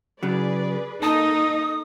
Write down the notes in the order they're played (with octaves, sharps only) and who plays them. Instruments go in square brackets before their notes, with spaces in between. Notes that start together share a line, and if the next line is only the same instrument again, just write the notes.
[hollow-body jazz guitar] C#3 F#3 [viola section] G#4 B4 D5
[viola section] A#3 A4 [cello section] D#4 [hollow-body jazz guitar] A5 [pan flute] D#6